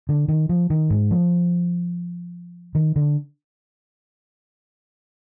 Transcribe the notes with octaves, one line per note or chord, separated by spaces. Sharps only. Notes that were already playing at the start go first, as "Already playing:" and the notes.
D3
D#3
F3
D#3
G#2
F3
D#3
D3